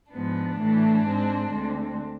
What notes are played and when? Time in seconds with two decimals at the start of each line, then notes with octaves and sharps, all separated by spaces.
0.13 G#2 F3 B3 D4
0.59 A2 E3 A3
1.05 G#2 G#3 C4
1.51 D2 D3 G#3 C4